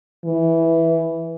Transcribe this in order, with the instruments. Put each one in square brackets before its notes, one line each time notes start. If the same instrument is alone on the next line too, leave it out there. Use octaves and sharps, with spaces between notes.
[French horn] E3